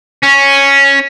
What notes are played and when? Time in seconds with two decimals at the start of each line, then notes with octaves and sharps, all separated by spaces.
0.23 C#4